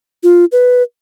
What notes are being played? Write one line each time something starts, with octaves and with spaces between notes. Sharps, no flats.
F4
B4